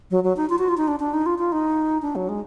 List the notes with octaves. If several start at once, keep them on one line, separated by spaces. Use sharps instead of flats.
F#3
F#3
D#4
F4
F#4
F4
D#4
D4
D4
D#4
F4
F4
D#4
D4
F#3
G#3